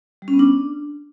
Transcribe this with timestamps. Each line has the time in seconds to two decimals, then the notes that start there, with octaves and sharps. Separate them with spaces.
0.22 G3
0.28 C#4
0.34 B3
0.39 D4